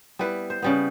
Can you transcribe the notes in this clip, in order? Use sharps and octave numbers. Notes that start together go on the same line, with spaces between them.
G3 B3 E4 B4
C5
C#3 G3 B3